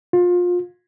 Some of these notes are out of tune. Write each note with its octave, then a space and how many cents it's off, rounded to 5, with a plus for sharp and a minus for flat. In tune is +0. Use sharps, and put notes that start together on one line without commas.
F4 +25